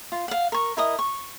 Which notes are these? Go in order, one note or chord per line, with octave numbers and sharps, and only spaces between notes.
F4
F5 F#5
A#4 C#6
E4 A#4 D#5 D#6
C#6